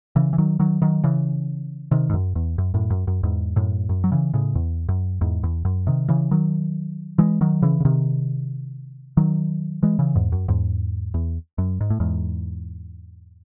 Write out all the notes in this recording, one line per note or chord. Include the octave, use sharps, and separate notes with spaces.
C#3 E3
E3
D#3 F#3
D#3 F#3
D#3 F#3
C#3 E3
C3 D#3
G#2
F#2
E2
F#2
F#2 A2
F#2
F#2
E2 G#2
F#2 A2
F#2
F#3
C#3 E3
A2 C#3
E2
F#2
E2 G#2
E2
F#2
C3 D#3
C#3 E3
D#3 F#3
E3 G#3
D#3 F#3
C#3 E3
C#3
C3 D#3
D#3 F#3
E3 G#3
C#3 E3
E2 G#2
F#2
E2 G#2
E2
F#2
G#2
A2
E2 G#2